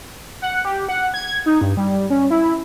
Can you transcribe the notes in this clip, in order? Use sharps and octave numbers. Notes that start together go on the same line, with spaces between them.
F#5
G4
F#5
G#6
D#4
G2
G3
C#4
E4